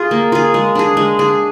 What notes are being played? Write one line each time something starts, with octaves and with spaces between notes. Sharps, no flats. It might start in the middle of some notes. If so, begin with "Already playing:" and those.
Already playing: F4 G#4
A#3
F4 G#4
G#3
D4 G#4
G#3
D4 G#4